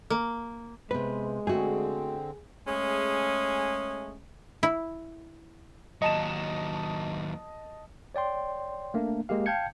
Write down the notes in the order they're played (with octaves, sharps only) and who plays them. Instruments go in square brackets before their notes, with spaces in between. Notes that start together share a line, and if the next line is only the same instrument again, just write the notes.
[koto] A#3
[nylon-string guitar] C3 B3 [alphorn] G#3 [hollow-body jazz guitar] B4
[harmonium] D3 C4 [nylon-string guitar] A3 F#4 [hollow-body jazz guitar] G#4
[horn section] G#3 A3 C#4 G#4
[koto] E4
[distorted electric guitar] D#2 F#3 [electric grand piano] D#5 A5 E7
[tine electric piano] C#5 D5 G5 C6
A3 A#3 D4
G#3 A#3 G4 F5
F5 G5 A5 G6 G#6 C#7